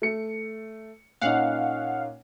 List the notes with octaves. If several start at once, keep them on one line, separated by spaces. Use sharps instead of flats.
A3 C#7
A#2 C#4 D#4 F5 F#5